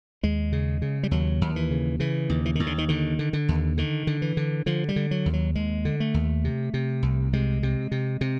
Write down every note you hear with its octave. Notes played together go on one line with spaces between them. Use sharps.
D#2 G#3
C#3
C#3
G3
D#2 F#3
D#2
E3
C#3
C#3 E3
D#2
E3
D#2 D#3
D3
D#3
D3 D#3
D3
D3
D#2
D3 D#3
D3
E3
D3
D3 F3
G3
D3
F#3
D#2
F#3
D#2 G#3
D3
A3
D#2
C3
C3
C2
C3 G#3
C3
C3
C3